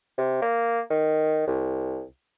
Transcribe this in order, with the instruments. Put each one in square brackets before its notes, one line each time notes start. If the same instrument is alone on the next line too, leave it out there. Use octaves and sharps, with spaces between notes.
[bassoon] C3
A#3
D#3
C2